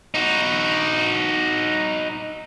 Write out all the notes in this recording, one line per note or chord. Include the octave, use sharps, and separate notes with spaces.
D#4 F#4